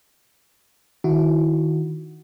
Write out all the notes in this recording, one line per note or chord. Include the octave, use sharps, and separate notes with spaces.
D#3 E4 F#4